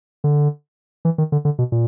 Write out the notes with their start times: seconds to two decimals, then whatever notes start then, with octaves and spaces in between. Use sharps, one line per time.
0.24 D3
1.05 E3
1.18 D#3
1.32 D3
1.45 D3
1.59 B2
1.72 A#2